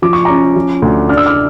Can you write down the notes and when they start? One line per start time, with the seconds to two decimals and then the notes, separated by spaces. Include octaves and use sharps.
0.02 F3 D6
0.13 C#6
0.25 C#4 A#5 D6
0.56 F3
0.82 D2
1.09 D4 F6
1.17 E6
1.26 D6 F6